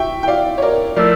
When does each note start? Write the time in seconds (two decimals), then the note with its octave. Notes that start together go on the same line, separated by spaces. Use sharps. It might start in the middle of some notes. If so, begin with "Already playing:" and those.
Already playing: E5 G5 C#6
0.23 G5
0.28 D5 F5
0.58 C#5
0.62 A#4 D5
0.96 F3 A3 E4 A#4 D5